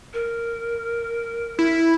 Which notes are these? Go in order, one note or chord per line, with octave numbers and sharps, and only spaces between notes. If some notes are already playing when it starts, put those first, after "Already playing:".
A#4
E4